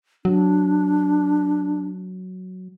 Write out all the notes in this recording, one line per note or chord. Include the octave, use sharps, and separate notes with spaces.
F#3 D4